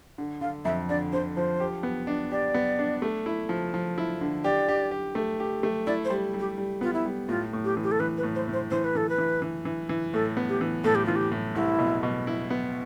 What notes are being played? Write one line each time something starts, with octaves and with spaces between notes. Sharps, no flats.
D3
D3 F5
F2 E5
D3 D5
D3 C5
F3 C5
G4
B3
D4
G4 D5
B3
D4
A3
E4
F3
F3
E4
D3
G4 D5
G4
G4
A3
G4
A3
E4 D5
C5
G3
G3
G4
G3
B3 F4
E4
G3
A2 F4
A2
G4
E3
G4
A4
E3 B4
B4
A2
C5
A2
C5
E3 C5
B4
E3 A4
B4
E3
E3
E3
E3
A2 A4
B3
G4
E3
A2 A4
G4
E3 F4
G4
A2
C2 E4
B2
B2
E4
B3